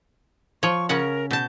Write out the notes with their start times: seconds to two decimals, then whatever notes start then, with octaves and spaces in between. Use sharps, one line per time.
0.63 F3 C#5 C#6
0.89 C#3 C#4 A#4 F#5
1.31 B2 A5 G6